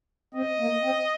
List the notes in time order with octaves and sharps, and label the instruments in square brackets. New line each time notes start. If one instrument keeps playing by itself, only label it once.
[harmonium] C4 [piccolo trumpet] D#5
[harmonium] A#3
C4